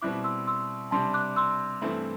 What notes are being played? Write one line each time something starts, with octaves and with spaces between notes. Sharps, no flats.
B2 G3 C4 E4 D6 F#6
C6 E6
C6 E6
C3 G3 D4 A5 C6
D6 F#6
C6 E6
G2 E3 A3 C4 E4